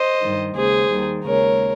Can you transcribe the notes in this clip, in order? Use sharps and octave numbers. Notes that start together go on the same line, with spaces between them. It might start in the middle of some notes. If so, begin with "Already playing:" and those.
Already playing: C5 D#5
G2 D#3 G3
D#2 C#3 G#3 G#4 C5
D#2 D#3 G3
D#2 C#3 G#3 A#4 C#5